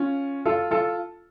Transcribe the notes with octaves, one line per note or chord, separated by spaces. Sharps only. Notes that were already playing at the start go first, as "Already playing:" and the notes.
Already playing: C#4 F4
F4 A4
F4 A4